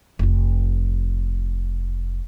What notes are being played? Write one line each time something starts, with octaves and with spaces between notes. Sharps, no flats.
F1 F4